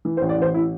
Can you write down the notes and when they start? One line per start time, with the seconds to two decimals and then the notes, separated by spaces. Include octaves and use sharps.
0.05 E3
0.17 C5
0.21 A1
0.29 D5
0.38 A1 C5
0.54 E4